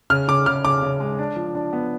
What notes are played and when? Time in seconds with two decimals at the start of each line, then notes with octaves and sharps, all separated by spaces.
0.10 C#3 F6
0.28 C#3 D6
0.46 C#3 F6
0.65 C#3 D6
0.82 C#3
1.00 G#3
1.19 D4
1.36 F3
1.55 D4
1.73 B3